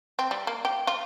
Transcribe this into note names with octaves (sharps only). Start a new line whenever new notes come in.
C4
G3
A#3
G4
F4